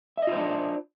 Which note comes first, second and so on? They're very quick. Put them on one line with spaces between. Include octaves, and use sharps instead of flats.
E5 D#5 F4 C5 D4